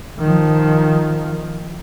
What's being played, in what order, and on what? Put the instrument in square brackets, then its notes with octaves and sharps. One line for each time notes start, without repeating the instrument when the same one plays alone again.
[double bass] D#3 F3